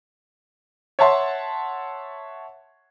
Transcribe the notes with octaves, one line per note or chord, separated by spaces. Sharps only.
C#5 E5 F#5 A5 C6